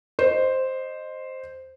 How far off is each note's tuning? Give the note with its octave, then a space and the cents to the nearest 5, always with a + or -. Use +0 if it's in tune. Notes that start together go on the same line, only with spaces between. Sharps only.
C5 +0 D#5 -15